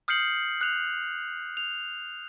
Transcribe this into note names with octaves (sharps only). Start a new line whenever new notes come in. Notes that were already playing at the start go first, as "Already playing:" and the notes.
D#6 F6 G6 C7 C#7 F#7
F#6 F7
F7